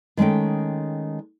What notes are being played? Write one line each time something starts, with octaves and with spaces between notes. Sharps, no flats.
D#3 G#3 A3 C#4 G5